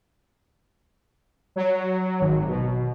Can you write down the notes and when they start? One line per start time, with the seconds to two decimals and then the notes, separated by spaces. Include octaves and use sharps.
1.56 F#3
2.20 G#1
2.48 B2